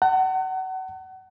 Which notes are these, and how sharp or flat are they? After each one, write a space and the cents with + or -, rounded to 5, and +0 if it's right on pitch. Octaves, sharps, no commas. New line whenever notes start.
F#5 +30 A5 +40